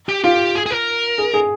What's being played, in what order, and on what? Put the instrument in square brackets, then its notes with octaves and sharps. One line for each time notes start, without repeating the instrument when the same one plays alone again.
[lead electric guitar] G4
[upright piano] F4 [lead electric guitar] G4
[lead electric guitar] G#4
G#4
A#4
[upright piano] G#4
G#4